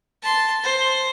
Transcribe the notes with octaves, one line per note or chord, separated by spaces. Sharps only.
A5 C6
C5